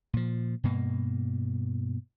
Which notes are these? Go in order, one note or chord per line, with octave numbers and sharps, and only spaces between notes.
A#2 F3
G2 B2 A#3